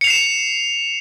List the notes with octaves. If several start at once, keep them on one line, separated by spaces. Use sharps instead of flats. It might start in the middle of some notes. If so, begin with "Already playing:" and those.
C7 C#7 E7 F7